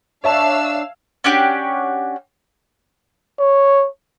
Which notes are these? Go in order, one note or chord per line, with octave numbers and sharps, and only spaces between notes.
D4 C#5 E5 F5 A5 E6
C#4 D4 F#4 G4
C#5